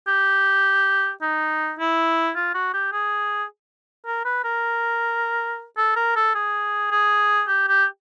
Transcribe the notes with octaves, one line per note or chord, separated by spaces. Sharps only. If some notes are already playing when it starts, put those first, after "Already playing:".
G4
D#4
E4
F4
F#4
G4
G#4
A#4
B4
A#4
A4
A#4
A4
G#4
G#4
G4
G4